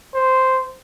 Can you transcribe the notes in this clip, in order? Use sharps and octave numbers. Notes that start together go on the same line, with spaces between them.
C5